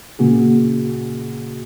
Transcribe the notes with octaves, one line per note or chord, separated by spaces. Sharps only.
A#2 C#3 A#3 F#4 G#4